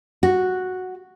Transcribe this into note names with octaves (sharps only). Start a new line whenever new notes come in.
F#4